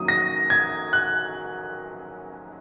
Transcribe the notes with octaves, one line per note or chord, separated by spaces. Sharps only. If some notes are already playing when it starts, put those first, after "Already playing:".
Already playing: F#2 D#3 F#3 A#3 D#6
A#6
G#6
F#6